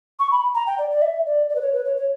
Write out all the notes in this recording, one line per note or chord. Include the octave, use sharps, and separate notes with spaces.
C#6
B5
A#5
G5
D5
D5
E5
D5
D5
B4
C#5
B4
C#5
C#5